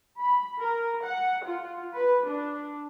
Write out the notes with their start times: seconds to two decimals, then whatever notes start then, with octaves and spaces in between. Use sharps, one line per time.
0.20 B5
0.61 A#4
1.05 F#5
1.45 F4
1.96 B4
2.27 D4